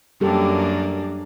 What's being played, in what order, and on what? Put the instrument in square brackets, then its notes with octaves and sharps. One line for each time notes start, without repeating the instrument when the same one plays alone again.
[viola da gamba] F#2 A#3 D4 [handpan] G3 G4 A4